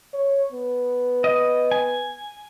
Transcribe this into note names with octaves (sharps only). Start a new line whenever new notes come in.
C#5
B3
D#5
G#5